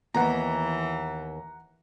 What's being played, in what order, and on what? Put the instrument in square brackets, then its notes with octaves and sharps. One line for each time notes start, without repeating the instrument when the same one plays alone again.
[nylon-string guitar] D#2 B3 [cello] E3 [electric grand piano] F#5 A#5